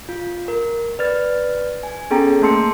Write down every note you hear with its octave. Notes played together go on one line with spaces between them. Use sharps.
F4
A#4
B4 D5 F6 A6
G#5
B3 C#4 G#4 A4 G5 A#5
A3 A#3 A5 C6 E6 C#7